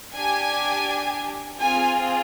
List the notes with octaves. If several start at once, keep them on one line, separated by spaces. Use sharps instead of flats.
D4 G4 G#5
C4 F4 G#4 G#5